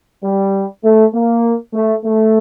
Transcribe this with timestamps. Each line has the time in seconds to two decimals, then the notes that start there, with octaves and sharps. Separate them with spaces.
0.23 G3
0.84 A3
1.14 A#3
1.73 A3
2.04 A3